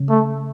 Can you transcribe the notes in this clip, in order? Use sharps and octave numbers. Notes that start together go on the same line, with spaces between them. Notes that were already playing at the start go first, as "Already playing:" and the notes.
Already playing: C#3
A3